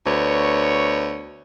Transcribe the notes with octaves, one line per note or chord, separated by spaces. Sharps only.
D2 B3 C#5